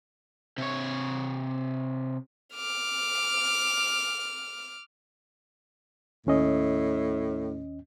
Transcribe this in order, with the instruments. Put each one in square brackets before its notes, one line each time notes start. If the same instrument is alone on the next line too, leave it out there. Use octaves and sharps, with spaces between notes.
[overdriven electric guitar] C3 C#5
[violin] D6 F6
[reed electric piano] D#2 C#4 D#5 [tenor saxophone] A2